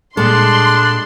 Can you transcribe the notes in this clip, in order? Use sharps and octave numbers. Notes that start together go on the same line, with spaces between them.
A#2 G3 G#3 D4 A4 C6